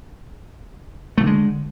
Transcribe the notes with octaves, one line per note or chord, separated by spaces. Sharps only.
D3 E3 G#3 A3